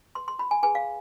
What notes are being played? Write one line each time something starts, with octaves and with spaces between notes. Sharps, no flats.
B4 C6
C6
F4 B5
G#5
G#4 B4 G#5
F5